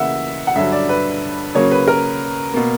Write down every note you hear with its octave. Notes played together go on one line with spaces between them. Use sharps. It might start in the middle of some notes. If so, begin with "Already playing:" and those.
Already playing: C#3 E3 A#3 E5 F#5
F#5
G2 D3 F#3 E5
D5
B4
C#3 F#3 A#3 C#5
B4
A#4
B2 A#3